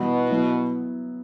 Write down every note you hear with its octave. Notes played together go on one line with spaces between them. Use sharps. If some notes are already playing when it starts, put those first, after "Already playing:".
Already playing: B2 E3 G3 B3 E4
F#3 B3 E4